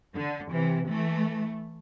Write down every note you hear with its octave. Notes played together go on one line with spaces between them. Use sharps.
D3
C3 E3
E3 A3